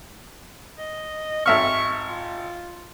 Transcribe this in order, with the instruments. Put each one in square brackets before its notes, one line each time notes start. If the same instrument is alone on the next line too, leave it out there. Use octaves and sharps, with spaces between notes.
[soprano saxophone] D#5
[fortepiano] G#1 E5 F6 [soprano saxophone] C#6
[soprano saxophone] F4